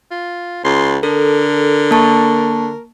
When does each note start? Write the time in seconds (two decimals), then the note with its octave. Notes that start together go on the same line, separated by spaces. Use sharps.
0.11 F4
0.65 C#2 C6
1.03 D3 A4 A#4
1.91 A#3 A5 C#6